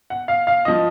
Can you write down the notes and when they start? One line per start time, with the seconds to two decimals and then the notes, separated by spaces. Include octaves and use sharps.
0.10 F#5
0.28 F5
0.47 F5
0.65 F3 D#5